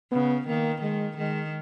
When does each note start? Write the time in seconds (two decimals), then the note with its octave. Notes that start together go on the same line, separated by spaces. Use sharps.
0.12 C#3 B3
0.47 D#3 A#3
0.82 D#3 G#3
1.18 D#3 G#3